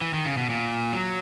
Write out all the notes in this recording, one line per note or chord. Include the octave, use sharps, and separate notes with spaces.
E3
D#3
C#3
B2
A#2
F#3